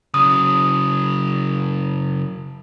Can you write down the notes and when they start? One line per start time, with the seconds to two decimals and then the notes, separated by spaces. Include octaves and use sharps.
0.14 C#3 F#3 D#6